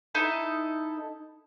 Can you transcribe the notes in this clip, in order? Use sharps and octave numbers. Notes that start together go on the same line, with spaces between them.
D#4 E4 A4